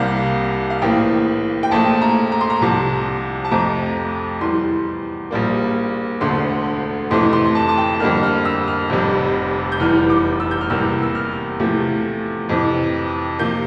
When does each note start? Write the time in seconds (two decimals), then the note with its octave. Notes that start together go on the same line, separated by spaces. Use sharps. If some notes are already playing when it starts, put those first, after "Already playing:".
Already playing: C2 C3 G3 A#3 F5
0.70 F5
0.82 A#1 A2 E3 A#3 G5
1.63 G5
1.71 A#1 A#2 A3 A5
2.02 A#5
2.32 A#5
2.41 C6
2.50 A#5
2.61 C2 C3 F3 A5
3.45 A5
3.51 F2 C3 F3 A3 A#5
4.41 E2 E3 G3 C6
5.31 A#1 A#2 G3 A#3
6.21 E1 D2 D3 A3 C6
7.11 F2 C3 E3 A3 C6
7.33 C6
7.55 A5
7.68 A5
7.78 G5
8.00 F2 D3 G3 A#3 F6
8.23 F6
8.45 E6
8.68 F6
8.90 F1 F2 C3 G3
9.72 G6
9.80 F1 E2 E3 G3 F6
10.10 D6
10.40 E6
10.51 G6
10.61 F6
10.70 E2 C3 G3 A#3 E6
11.03 E6
11.15 F6
11.59 E2 C3 F3 A3
12.49 F2 C3 E3
13.39 C3 F3 A#3 G6